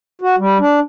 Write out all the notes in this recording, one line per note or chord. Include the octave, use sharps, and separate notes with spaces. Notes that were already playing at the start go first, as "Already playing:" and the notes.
F#4
G3
D4